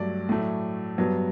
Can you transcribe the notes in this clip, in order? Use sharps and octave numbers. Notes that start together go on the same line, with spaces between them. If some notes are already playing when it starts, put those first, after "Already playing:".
Already playing: G2 F#3 A3 D5
A2 F#3 A3
G2 F#3 B3